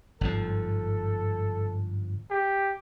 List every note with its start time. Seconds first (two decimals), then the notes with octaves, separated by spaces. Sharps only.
0.21 G1 G#2 F3 A4
2.31 G4